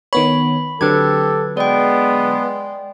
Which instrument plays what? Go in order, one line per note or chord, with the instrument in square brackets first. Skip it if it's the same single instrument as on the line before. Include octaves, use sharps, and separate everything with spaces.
[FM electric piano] D#3 B3 C#5 [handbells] B5
[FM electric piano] D3 F#3 [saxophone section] C4 G4 [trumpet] A4 [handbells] B4 G#6
[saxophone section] G#3 [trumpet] B3 [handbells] D5 G5